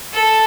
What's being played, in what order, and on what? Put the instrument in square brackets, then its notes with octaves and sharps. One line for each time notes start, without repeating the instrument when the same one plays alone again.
[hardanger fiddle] A4